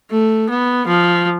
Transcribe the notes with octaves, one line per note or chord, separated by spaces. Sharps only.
A3
B3
F3